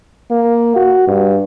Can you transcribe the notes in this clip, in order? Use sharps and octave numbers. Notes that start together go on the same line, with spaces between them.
A#3
F#4
G2